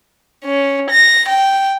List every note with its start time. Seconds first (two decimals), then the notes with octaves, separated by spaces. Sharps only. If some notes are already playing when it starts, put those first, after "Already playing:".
0.44 C#4
0.91 A#6
1.29 G5